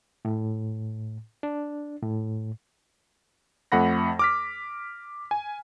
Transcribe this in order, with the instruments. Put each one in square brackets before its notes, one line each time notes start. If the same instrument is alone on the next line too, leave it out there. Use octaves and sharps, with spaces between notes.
[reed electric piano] A2
D4
A2
[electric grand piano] F2 A3 F#5 B5 A#6
D6 F6 B6
G#5